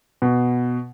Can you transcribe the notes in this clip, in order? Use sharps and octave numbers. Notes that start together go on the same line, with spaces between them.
B2